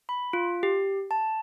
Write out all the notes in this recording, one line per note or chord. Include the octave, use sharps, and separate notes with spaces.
B5
F4
G4
A5